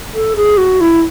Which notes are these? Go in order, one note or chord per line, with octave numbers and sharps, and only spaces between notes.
A4
G#4
F#4
E4